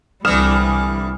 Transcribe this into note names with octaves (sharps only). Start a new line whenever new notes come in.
C2 D3 E3 G3 D#6 F6 E7